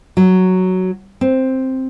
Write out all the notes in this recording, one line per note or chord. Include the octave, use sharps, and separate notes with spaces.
F#3
C4